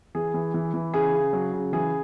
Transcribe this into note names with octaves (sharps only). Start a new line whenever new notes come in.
E3 G#4
E3
E3
E3
C#3 G#4
C#3
F#3
C#3
E3 G#4